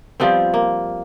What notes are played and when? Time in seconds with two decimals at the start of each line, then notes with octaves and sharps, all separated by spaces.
0.20 F3 G3 B3 C4
0.54 A#3